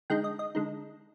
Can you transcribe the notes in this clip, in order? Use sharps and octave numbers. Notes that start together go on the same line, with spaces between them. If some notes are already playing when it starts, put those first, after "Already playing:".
D3 G#3 D#4 G5
D#5
D#5
D3 G#3 D#4